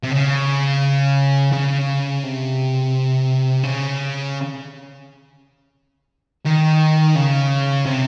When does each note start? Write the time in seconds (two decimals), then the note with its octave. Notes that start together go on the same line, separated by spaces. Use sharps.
0.03 C3
0.11 C#3
1.52 C#3
2.23 C3
3.63 C#3
6.45 D#3
7.15 C#3
7.86 C3